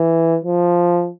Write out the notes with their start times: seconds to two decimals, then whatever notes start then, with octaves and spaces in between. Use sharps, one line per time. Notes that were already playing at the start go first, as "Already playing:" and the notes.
Already playing: E3
0.44 F3